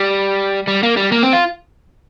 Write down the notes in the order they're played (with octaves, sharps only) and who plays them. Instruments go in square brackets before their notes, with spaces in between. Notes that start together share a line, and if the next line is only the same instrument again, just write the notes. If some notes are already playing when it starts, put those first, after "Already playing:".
Already playing: [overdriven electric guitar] G3
G3
A#3
G3
A#3
C4
F4